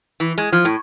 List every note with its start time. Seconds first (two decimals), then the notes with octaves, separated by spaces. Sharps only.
0.20 E3
0.38 G#3
0.52 F3
0.65 A2